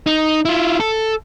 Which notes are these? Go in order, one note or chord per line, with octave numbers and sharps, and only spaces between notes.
D#4
E4 F4
A4